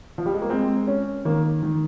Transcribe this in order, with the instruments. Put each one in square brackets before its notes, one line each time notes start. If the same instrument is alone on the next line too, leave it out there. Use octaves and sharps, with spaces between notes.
[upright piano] F3
G3
G#3
A#3
[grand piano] G#3 [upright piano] C4
[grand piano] C#4
[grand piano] D#3 [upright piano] A#3
[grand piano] D#3